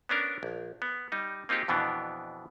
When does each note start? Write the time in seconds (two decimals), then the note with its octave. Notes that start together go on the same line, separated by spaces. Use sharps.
0.09 B3 C#4 D4 A#4
0.43 A#1
0.82 B3
1.12 G3 D#4
1.49 A#3 C4 D#4 F4 G4 G#4
1.68 F2 B2 E3 B3 D4